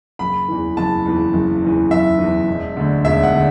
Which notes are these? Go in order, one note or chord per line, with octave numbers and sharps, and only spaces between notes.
F#1 B5
E2 E3
F#1 A5
E2 E3
F#1
E2 E3
F#1 E5
E2 E3
E1
D2 D3
E1 E5
F#5
D3